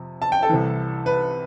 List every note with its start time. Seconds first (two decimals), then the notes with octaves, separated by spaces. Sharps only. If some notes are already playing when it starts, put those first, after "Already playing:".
Already playing: F2 C3
0.22 A5
0.32 G5
0.42 A4 A5
0.49 C2 C3 E3
1.06 B4